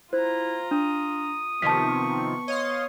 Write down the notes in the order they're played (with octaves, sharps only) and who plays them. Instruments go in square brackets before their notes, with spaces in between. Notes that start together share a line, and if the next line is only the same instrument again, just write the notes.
[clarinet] E4 [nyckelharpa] F4 A#5 [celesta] C5
[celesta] D4 [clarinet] D#6
[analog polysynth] C3 D#3 F3 [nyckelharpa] B3 C#6 [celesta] A5 B6
[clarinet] C#5 [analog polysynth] D#5 F5 C6